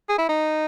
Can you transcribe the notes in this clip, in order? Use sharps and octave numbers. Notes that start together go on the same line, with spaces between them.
G#4
E4
D#4